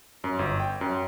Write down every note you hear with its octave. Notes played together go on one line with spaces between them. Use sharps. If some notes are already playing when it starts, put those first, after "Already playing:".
F#2
G1
G5
F#2